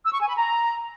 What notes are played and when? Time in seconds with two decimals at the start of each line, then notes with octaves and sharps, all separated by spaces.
0.05 E6
0.13 C#6
0.21 G#5
0.29 B5
0.37 A#5